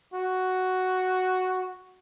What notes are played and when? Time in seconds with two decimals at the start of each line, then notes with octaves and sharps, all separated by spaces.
0.14 F#4